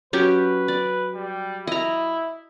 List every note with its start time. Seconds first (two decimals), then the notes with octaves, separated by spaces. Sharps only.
0.13 F#3 C#4 G4 B4
0.68 D5
1.14 G3
1.67 E4 D#5 A#5